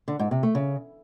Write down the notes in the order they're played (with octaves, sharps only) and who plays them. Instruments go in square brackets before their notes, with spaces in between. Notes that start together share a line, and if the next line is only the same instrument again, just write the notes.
[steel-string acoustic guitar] D3
G#2
C3
A3
C#3